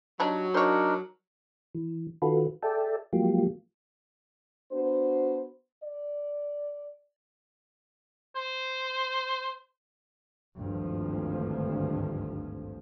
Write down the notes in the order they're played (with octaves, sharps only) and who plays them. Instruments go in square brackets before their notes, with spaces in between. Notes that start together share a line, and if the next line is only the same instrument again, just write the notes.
[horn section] F#3 [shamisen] G3 D4 D#4
[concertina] D4 D#4 A#4 [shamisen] C5 C#5
[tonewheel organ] E3
D#3 F4 F#4 A4 B4
G#4 A4 D5 E5 G5 A5
F3 F#3 G#3 A#3 F4 G4
[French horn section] B3 D4 F#4 C5
D5
[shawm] C5
[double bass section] G#1 D2 G2 F3